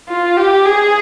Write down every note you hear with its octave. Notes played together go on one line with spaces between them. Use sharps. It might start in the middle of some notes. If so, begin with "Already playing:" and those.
F4
G4
G#4